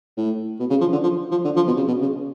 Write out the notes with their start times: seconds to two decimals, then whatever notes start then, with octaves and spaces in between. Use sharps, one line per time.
0.17 A2
0.60 B2
0.70 C#3
0.81 F3
0.92 D3
1.03 F3
1.31 F3
1.45 D3
1.56 F3
1.67 B2
1.77 C#3
1.87 B2
2.02 C#3